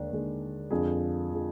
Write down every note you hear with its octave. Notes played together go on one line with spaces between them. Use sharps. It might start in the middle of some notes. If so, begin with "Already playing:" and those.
Already playing: D#2 D3 G#3 D4
D#2 D3 G#3
F2 D3 F3 G#3 G#4
D3 F3 G#3